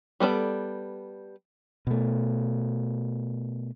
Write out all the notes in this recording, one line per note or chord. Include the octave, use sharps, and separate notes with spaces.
G3 B3 A4 D5
B2 A3